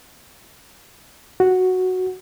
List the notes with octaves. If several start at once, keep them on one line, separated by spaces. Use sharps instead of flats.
F#4